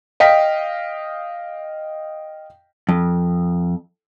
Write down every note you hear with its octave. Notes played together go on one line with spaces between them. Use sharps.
D#5 F5 G5 B6
F2